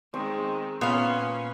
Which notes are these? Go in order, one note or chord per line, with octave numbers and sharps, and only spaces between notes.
D#3 G#3 C4 C#6
A#2 B3 C#4 C#5 F5